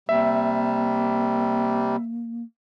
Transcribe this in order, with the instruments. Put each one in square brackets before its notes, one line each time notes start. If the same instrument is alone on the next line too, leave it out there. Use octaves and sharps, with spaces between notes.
[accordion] C3 G3 [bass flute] A#3 [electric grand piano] E5